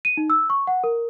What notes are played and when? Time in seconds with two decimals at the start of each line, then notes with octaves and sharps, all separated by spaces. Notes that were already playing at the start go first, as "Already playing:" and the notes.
0.05 D#7
0.17 D#4
0.30 E6
0.50 C#6
0.67 F#5
0.84 A#4